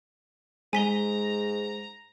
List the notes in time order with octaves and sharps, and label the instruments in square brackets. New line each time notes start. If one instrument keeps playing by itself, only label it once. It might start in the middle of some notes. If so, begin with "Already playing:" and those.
[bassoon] G#2 [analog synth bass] G#3 [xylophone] G#5 B6 G7 [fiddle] A#5